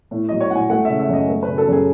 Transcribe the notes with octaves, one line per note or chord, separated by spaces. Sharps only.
A2
F#3 D#5
C#5
A2 F#5
G#5
A3 F#5
C#3 E5
E5
F#2 D#5
A3
B4
C#3
A4
F#2
G#4